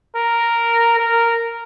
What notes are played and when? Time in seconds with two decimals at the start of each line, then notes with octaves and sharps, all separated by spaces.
0.16 A#4
0.99 A#4